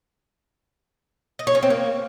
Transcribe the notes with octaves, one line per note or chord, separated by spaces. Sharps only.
D#5
C#5
C#4
C4
A#3